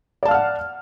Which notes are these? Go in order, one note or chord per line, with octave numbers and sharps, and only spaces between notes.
D5 F5 F#5 A5 F6